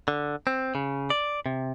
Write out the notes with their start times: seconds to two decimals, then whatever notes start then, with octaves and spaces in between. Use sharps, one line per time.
0.08 D3
0.47 C4
0.75 C#3
1.10 D5
1.46 C3